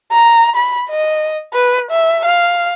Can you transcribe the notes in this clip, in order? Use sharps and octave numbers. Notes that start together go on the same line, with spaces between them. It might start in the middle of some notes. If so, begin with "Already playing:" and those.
A#5
B5
D#5
B4
E5
F5